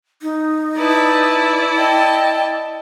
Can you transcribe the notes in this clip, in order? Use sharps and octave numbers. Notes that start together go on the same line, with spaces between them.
D#4
E4 B4 D5 A5
D#5 G5 A5